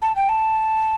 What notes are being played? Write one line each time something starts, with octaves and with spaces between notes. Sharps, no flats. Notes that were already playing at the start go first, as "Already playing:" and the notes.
A5
G5
A5